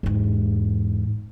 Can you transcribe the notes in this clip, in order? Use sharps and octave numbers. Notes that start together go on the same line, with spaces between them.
E2 G#2